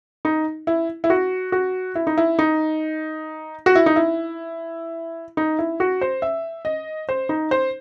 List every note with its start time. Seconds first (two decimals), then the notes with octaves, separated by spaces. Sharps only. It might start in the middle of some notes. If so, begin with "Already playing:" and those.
0.25 D#4
0.67 E4
1.04 E4
1.10 F#4
1.52 F#4
1.95 E4
2.07 D#4
2.17 E4
2.39 D#4
3.66 F#4
3.75 E4
3.86 D#4
3.96 E4
5.37 D#4
5.59 E4
5.80 F#4
6.01 C5
6.22 E5
6.65 D#5
7.09 C5
7.29 D#4
7.51 C5